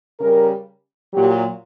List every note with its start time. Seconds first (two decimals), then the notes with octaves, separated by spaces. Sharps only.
0.19 C#3 G3 A#4
1.12 A#2 F#3 G4